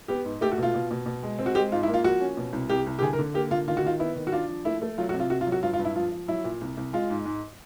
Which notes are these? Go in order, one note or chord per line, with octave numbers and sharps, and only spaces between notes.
B3 G4
G#2
A3 G4
F#4
B2 F4
B2
B2
B2
G#3
C4
F#4
G#3 G4
G#2 F4
E4
A#3
F4
F3 F#4
C#4
B2
C2
C2 G4
C2
G4
D3 G#4
A#4
D3
A#3 G4
D3 F4
D#3 F4
F#4
D#3 F4
B3 E4
D#3
F#4
D4 F4
F3
A3 E4
A3
F#3 F4
F#4
C3
F4
C3 F#4
F4
F#3
F#4
G2 F4
F4
G2
E4
F3 F4
F3
F#3 E4
A#2
C2
C2
G#3 F4
G#2
G#2